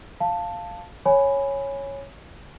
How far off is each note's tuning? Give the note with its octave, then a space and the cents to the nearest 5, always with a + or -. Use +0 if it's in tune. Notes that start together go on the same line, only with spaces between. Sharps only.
F5 +0 A5 +5
C#5 -5 G#5 +0 B5 +5